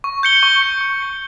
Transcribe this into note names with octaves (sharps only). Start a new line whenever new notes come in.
C#6
G6 C#7 G7
C#6
G6 C#7 G7
C#6
G6 C#7 G7